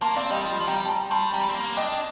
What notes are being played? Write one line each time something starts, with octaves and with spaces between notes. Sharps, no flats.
A#3 A5 C6
C4 D5 F5
G3 D#5 G5
F3
F3
G3 G5 A#5
A5
G5 A#5
G3 A5 C6
G3 G5 A#5
C4
A#3
D4 D#5 G5